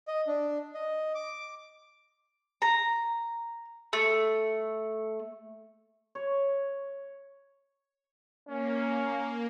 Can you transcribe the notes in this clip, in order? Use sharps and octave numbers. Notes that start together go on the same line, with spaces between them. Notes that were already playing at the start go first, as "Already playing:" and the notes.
D#5
D4
D#5
D6
A#5
A3
C#5
A#3 C#4